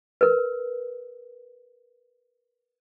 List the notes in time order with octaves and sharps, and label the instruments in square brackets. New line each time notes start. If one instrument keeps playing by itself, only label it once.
[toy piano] A#4 B4